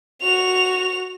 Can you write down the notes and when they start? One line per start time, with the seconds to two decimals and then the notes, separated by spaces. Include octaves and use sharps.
0.22 F#4 F7